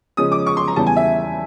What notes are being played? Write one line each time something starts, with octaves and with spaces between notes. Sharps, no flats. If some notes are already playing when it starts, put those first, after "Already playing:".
C#3 F3 G#3 C#4 D#6
D6
C#6
C6
A#5
E2 C#3 E3 G3 A5
G#5
E5